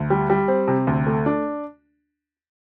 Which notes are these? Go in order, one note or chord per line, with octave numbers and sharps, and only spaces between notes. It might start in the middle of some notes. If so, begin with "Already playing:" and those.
Already playing: D2
G3
G3
C4
C3
D2
A3
D4